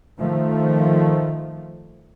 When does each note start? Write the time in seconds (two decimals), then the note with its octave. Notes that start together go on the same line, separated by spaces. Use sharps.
0.20 D#3 F3 A3